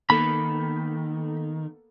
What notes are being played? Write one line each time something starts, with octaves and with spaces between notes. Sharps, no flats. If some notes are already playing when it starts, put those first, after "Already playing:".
D#3 A#3 B3 A4 B5